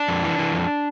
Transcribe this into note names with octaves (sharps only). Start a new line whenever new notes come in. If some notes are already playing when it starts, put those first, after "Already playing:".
Already playing: D4
F2
E3
E3
F2